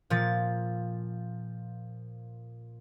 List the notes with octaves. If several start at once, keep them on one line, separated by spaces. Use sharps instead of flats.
A#2 F3 A6